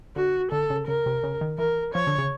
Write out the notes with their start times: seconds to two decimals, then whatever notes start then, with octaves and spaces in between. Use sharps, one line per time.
0.16 D3 F#4
0.52 D3 A4
0.70 C#3
0.87 C#3 A#4
1.06 C3
1.23 C#3
1.41 D#3
1.58 E3 A#4
1.94 F3 C#5
2.07 D3
2.18 C#3